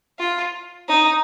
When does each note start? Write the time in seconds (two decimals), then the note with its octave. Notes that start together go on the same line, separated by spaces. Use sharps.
0.19 F4
0.88 D#4